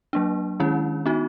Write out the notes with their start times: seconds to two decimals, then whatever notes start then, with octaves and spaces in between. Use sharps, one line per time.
0.13 F#3 A#3 D4
0.60 D#3 G#3 C#4 E4
1.06 B3 D#4 F#4